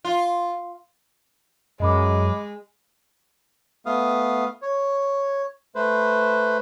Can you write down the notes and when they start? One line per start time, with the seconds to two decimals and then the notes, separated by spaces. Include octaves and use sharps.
0.05 F4
1.80 F#2 G#3 D#5 B5 D6
3.86 A3 B3 F5 D#6
4.62 C#5
5.75 A3 B4 C5